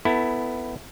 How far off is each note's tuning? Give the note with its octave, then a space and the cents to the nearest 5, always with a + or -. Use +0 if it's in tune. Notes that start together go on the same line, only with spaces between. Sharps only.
B3 +15 E4 +0 A4 +30